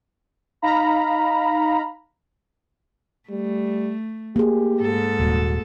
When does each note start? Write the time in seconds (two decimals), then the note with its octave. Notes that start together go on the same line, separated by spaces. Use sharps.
0.62 D#4 F5 A#5 B5
3.30 G3 A3
4.36 A#3 G4 G#4
4.80 G#2 A4
5.20 D#1 F#4